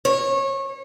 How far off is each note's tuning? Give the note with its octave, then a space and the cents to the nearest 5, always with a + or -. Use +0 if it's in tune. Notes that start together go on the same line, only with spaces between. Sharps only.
C#5 -25